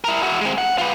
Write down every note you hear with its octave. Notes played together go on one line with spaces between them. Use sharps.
E4 A#4
E4 F#4
G#3 C4
F#5
F4 B4